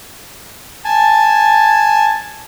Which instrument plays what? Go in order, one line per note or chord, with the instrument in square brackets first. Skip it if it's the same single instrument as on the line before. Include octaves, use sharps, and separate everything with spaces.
[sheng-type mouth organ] G#5 A5